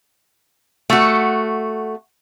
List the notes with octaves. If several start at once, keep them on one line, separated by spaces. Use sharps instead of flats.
A3 F#4